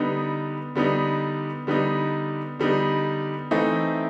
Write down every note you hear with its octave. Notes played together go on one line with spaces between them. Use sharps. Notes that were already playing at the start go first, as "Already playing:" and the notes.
Already playing: D3 G3 B3 D#4
D3 G3 B3 D#4
D3 G3 B3 D#4
D3 G3 B3 D#4
E3 A3 C4 D#4